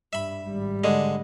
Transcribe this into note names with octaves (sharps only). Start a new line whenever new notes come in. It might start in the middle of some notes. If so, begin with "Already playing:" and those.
G2 E5 B5
G#1 G3
D3 G#3